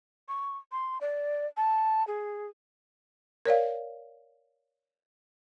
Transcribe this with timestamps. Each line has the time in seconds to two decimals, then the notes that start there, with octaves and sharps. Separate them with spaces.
0.28 C#6
0.72 C6
1.01 D5
1.57 A5
2.07 G#4
3.45 A#4 C#5 D5 F5